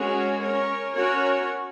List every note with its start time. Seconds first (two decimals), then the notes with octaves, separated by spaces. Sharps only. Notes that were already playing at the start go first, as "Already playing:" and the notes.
Already playing: G#3 C#4 F#4 A#4 C#5
0.42 C#4 A#4 C#5
0.94 C#4 F#4 A#4 C#5